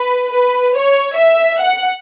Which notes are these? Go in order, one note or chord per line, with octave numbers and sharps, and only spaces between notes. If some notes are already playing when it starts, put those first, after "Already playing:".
Already playing: B4
B4
C#5
E5
F#5